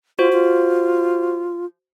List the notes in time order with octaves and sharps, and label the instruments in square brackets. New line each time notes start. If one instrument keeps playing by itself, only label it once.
[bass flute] F4 [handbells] F#4 C5
[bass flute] F4